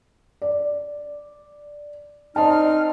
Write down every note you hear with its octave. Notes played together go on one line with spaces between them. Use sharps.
D5
C4 D#4 D5 D#5 A5 F6